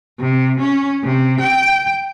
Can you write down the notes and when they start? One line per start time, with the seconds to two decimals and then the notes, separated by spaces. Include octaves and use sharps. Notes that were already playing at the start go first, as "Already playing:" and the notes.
0.20 C3
0.60 C#4
1.04 C3
1.40 G5